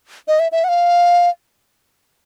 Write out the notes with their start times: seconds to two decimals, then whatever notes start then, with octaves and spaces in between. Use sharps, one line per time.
0.28 D#5
0.39 E5
0.52 E5
0.64 F#5
0.69 F5